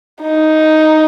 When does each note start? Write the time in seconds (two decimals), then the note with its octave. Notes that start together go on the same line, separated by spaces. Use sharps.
0.21 D#4